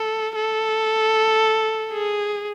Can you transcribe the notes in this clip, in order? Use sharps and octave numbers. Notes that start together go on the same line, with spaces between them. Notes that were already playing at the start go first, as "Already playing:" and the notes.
Already playing: A4
A4
G#4